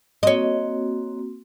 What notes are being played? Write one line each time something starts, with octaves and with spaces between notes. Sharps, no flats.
A#3 C4 F#4 C#5 D#5